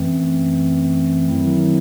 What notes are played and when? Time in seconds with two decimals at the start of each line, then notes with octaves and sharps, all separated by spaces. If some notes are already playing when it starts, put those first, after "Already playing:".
Already playing: F#2 E3 A3 C4
1.29 D#3 F#3 A3 C4 E4